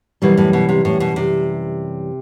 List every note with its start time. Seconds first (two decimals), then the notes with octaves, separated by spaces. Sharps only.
0.22 F#2 B2 E3 G3
0.37 A2
0.53 B2
0.69 C3
0.85 A2
1.00 B2
1.16 C3